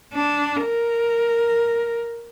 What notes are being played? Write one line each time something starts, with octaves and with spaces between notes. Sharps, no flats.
D4
A#4